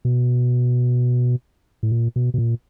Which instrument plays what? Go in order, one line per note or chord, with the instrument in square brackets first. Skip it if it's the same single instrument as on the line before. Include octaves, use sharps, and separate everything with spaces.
[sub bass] B2
A2
A#2
B2
B2
A#2